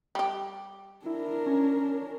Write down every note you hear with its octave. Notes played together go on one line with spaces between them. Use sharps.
G3 G4
D4 E4 A#4
C#4